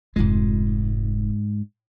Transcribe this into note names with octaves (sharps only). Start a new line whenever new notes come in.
F1 G#2 G#3 F4